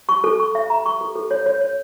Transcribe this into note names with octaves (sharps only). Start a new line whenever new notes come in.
C#6
A4
C#6
E5
A#5
C#6
A4
A4
C#5
C#5
C#5